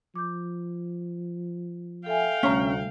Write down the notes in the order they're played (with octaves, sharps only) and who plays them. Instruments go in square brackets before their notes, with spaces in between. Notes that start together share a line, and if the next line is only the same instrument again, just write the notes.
[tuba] F3 [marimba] D6 G6
[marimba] A4 E5 G#5 [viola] F5 G5
[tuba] D2 [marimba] C3 G3 A3 [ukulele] C#4 A#5